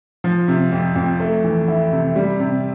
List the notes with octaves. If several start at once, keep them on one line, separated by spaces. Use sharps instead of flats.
F3
C3
F2
F2
A3
E3
E4
C3
G3
C3